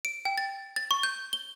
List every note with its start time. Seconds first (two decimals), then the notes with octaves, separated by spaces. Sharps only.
0.05 D7
0.25 G5
0.38 A6
0.76 A6
0.91 C#6
1.03 G6
1.33 G7